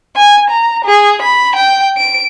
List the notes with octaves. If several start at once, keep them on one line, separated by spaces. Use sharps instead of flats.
G#5
A#5
G#4
B5
G5
D7